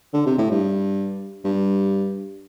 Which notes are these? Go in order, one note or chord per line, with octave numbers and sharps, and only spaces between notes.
D3
C3
A2
G2
G2